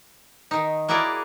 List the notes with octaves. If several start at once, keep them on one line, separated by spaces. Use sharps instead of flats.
D#3 D#4
A#3 E4 F#4 G#4 A#4 D5